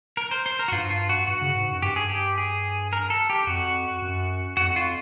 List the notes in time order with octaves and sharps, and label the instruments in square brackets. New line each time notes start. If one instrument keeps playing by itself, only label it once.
[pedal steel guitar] A#4
C5
C5
A#4
F#4
[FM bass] G2 [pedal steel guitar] F4
[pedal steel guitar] F4
F#4
[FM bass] G2 [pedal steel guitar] F#4
[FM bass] C#3
G#2
F#2
[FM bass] G2 [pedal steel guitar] G4
[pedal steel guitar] G#4
G4
G#4
A#4
A4
G4
[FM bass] F2 [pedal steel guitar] F#4
[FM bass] F#2
[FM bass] F2 [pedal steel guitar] F#4
[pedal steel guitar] F4